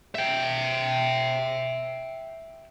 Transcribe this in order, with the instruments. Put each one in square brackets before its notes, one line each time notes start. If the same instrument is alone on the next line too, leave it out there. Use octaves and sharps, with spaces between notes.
[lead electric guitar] E5 G5